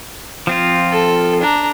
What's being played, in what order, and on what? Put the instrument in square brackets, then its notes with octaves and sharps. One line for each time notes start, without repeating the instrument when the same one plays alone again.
[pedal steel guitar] F3 C4 F4
[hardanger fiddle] A4
D4 A#5